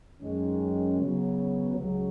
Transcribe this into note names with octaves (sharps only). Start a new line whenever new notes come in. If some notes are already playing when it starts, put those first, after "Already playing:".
F#2 D#3 G#3 C#4
C#3 F#3 B3
C#2 C#3 F#3